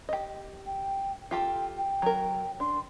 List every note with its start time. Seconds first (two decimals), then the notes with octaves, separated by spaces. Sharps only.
0.09 G4 D#5
0.66 G5
1.31 F4 G4 A4 G5
1.78 G5
2.02 F#3 A#4
2.60 D4 C6